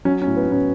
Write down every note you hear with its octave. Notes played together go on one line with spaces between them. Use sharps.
F#3 C#4
C#4
A2
B3
A2 C#4